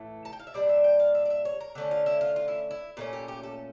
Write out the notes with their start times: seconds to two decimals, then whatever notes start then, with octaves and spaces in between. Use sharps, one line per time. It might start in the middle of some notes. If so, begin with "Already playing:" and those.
Already playing: A2 E3 A3
0.25 A5
0.33 G5
0.40 F5
0.47 E5
0.54 A#2 G3 D4 D5
0.69 E5
0.84 G5
0.99 F5
1.15 E5
1.25 D5
1.30 E5
1.45 C#5
1.60 A#4
1.75 D3 A3 C#4
1.91 F4
2.06 E4
2.21 F4
2.36 F4
2.48 E4
2.71 E4
2.97 A#2 A3 C#4
3.13 G4
3.28 G4
3.43 A4